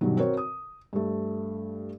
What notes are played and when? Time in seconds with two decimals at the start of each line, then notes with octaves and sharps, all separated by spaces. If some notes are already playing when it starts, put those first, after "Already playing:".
0.01 G2 B2 D#3 F#3
0.17 C4 F#4 A#4 C#5
0.37 D#6
0.93 G2 A3